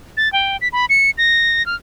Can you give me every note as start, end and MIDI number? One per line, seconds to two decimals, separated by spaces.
0.17 0.31 93
0.33 0.57 79
0.61 0.68 95
0.73 0.86 83
0.89 1.11 97
1.18 1.65 94
1.66 1.75 89